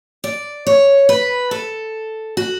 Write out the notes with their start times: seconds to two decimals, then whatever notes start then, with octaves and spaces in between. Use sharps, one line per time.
0.24 D5
0.67 C#5
1.09 B4
1.51 A4
2.37 F#4